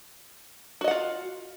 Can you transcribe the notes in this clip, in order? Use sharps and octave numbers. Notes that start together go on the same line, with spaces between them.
F4 F#4 D#5 F#5